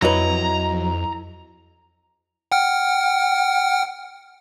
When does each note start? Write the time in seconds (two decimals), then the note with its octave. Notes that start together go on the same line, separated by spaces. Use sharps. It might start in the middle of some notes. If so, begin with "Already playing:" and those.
0.02 F2 F#3 E4 B4 D#5 A#5
2.52 F#5 G5 F6